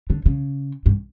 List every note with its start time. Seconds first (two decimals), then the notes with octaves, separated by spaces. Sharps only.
0.10 D3
0.26 C#3
0.86 G2